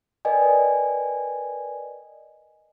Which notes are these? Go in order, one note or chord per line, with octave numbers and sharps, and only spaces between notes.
A#4 B4 D5 D#5 G5 G#5